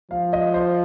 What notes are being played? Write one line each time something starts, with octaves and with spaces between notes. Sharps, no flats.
F3 F5
D#5
C5